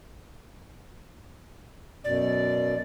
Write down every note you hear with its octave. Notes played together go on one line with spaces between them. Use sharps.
F#2 B2 D5